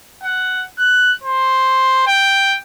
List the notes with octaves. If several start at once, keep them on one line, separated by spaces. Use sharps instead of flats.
F#5
F#6
C5
G5